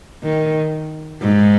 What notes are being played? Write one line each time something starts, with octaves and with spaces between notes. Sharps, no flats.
D#3
G#2